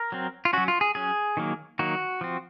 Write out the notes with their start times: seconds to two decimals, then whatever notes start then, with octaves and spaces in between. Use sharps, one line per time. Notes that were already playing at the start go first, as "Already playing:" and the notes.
Already playing: A#4
0.12 F#3 C4
0.45 F4
0.53 F#3 C#4 F#4
0.68 F4
0.81 G#4
0.95 F#3 C#4 G#4
1.37 D#3 F#3 A#3
1.79 D#3 F#3 A#3 F#4
2.21 F3 C4